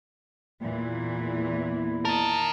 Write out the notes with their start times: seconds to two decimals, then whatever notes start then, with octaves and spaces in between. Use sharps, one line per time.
0.62 E2 A#2 E3 E4
2.05 D#4 A#4 A5